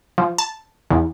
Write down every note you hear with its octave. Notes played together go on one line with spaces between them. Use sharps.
F3
A5
E2